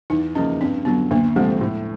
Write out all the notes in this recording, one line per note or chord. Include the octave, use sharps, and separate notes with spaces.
E2 D#4
C#3 F3 A#3 C#4 D#4
G2 C4
D3 F#3 B3
D2 A#3
C3 F3 G#3 A3 C4
A2